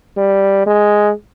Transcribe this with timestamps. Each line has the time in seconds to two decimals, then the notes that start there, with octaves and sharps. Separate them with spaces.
0.18 G3
0.67 G#3